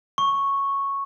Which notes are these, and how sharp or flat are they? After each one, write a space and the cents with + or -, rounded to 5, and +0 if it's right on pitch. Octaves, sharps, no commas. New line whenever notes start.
C#6 -5